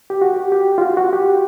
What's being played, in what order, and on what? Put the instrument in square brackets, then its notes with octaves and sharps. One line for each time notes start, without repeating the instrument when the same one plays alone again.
[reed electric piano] G4
F#4
G4
G4
F4
F#4
F#4
G4